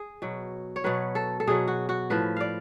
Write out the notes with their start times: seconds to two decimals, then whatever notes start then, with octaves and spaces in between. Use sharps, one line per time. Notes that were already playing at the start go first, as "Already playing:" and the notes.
Already playing: G#4
0.22 B2 F#3
0.76 C#5
0.84 B2 F#3 B4
1.15 A4
1.40 A4
1.47 B2 F#3 G#4
1.68 F#4
1.89 F#4
2.10 A2 F3 B4
2.36 D5 F5